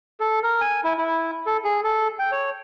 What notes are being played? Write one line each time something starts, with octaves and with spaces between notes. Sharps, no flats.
A4
A#4
G#5
E4
E4
A4
G#4
A4
G5
C#5